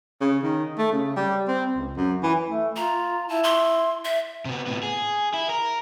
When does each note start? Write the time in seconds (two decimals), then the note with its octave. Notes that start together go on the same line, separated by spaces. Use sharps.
0.21 C#3
0.43 D#3
0.78 A3
0.92 C#3
1.16 G3
1.48 C4
1.75 C#2
1.97 F#2
2.23 E3
2.49 A3
2.76 F4 A#5
3.29 E4 A5
3.44 C6
4.05 E5
4.45 C3 B3
4.66 A2 B3
4.83 G#4
5.34 E4
5.50 A#4